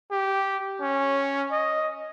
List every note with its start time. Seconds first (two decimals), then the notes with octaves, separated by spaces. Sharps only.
0.11 G4
0.81 C#4
1.52 D#5